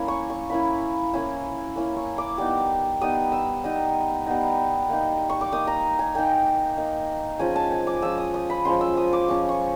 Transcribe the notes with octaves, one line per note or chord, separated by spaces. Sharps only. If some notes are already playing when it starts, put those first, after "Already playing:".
Already playing: A#3 C#4 E4
C#6
C#6
A#3 C#4 E4 B5
A#3 C#4 E4
A#3 C#4 E4
C#6
D6
G3 B3 D#4 D6
G3 B3 D#4 D#6
E6
G3 B3 D#4 D#6
G3 B3 D#4
A#3 D#4
C#6
D6
A#3 D#4 D#6
A#5
G#5
A#3 D#4 G5
A#3 D#4
F3 G#3 C#4 G#5
A5
G#5
D6
F3 G#3 C#4 E6
D#6
D#6
B5
F3 G#3 C#4 C6
E6
D#6
D6
F3 G#3 C#4 C#6
C#6